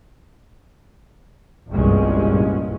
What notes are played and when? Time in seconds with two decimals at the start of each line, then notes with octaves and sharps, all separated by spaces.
1.70 G1 C2 G2 A#2 G#3 C#4